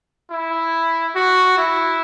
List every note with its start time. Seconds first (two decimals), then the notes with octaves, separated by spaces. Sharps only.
0.30 E4
1.15 F#4
1.58 E4